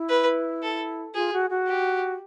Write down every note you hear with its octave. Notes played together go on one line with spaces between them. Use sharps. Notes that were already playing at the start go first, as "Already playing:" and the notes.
Already playing: E4
B4
A4
F4 G#4
F#4
F#4
G4